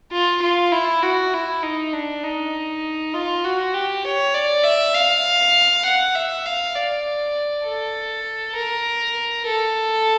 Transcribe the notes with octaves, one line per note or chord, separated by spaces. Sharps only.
F4
F4
E4
F#4
E4
D#4
D4
D#4
F4
F#4
G4
C#5
D5
E5
F5
F#5
E5
F5
D5
A4
A#4
A4